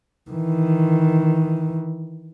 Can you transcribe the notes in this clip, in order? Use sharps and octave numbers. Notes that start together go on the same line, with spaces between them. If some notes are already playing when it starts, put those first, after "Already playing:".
D#3 E3